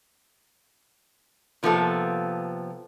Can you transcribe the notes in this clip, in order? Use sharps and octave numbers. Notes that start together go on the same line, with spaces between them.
C3 F3 A#3 B3 A4